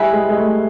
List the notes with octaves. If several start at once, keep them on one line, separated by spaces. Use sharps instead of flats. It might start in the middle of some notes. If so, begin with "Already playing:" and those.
Already playing: G3 E4 G#4 B4 E5
G#3
G#3
A3